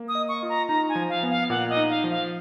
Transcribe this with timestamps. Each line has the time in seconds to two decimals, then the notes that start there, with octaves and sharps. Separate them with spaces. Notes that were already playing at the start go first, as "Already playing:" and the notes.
Already playing: A#3
0.08 D#6
0.15 D#5
0.29 C#6
0.43 F4
0.49 A#5
0.69 D#4 A#5
0.89 G#5
0.95 F3
1.09 F5
1.23 B3
1.30 F5
1.50 A#2 F#5
1.69 D#5
1.77 D#4
1.90 F5
2.04 F3
2.11 F5